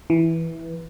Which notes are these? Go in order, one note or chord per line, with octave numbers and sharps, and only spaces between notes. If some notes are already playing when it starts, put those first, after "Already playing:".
E3